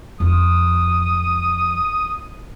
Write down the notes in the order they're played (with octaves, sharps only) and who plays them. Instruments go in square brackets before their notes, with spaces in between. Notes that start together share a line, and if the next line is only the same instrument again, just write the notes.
[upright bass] F2 F3 [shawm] D#6